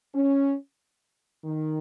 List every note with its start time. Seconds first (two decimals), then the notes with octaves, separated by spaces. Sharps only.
0.14 C#4
1.44 D#3